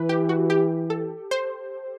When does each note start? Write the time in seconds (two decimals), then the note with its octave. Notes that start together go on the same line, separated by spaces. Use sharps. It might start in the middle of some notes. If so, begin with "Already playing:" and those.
Already playing: E3 B4
0.09 G4
0.29 F#4
0.50 G4
0.90 A4
1.31 C5